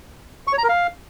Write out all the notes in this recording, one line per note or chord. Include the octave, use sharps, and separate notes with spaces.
C#6
C#5
A#5
A#4
F5